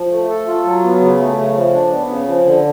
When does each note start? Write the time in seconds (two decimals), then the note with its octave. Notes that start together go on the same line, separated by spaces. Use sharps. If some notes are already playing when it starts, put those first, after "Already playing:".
Already playing: F3
0.11 A3
0.30 A4
0.48 F4
0.65 F#3
0.83 B3
1.01 C#3
1.20 A3
1.38 C#3
1.56 F3
1.73 D4
1.92 B3
2.09 C#3
2.28 F3
2.46 D3